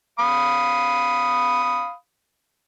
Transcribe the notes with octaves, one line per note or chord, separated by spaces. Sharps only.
F5 B5 D#6